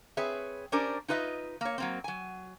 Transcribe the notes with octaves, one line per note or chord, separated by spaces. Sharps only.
C4 G#4 B4 C#5 E5
C#4 D4 G4 A#4 C5 D5
D#4 F4 B4 D#5 E5
A#3 C#5
F#3 A#3 C4
F#3 G#5